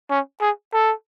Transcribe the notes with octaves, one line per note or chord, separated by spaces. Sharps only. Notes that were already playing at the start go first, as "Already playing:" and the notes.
C#4
G#4
A4